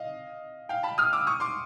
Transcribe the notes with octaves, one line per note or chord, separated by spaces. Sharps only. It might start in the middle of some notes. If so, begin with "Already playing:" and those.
Already playing: D#5 F5
F5 G5
A5 B5
D#6 F6
D6 E6
C#6 D#6
C6 D6